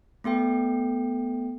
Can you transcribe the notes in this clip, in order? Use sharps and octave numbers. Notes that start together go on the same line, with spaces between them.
A3 B3 A4 G5